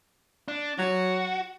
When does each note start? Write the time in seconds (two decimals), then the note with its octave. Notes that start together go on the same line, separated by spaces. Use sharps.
0.48 D4
0.79 F#3 F#4